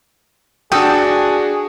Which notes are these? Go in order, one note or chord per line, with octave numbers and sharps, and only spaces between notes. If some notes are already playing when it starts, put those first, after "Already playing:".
D4 F#4 G#4 A4 G5 D#6